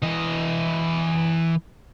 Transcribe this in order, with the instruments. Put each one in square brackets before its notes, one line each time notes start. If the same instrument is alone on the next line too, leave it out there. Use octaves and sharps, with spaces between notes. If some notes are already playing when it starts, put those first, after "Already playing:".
[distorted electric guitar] E3 D#5